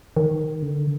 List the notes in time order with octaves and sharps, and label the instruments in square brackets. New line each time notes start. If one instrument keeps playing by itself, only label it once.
[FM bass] D#3
D3